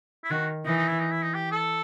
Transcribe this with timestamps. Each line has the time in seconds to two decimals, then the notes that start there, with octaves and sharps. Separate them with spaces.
0.24 E4
0.30 D#3 F#4
0.65 E3 D#4
0.77 D#4
0.88 E4
1.00 D#4
1.11 E4
1.23 D#4
1.34 G4
1.52 A4